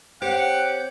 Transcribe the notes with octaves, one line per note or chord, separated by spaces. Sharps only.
C4 G4 C5 C#5 F#5 G6